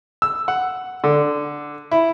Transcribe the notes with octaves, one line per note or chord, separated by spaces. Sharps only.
E6
F#5
D3
E4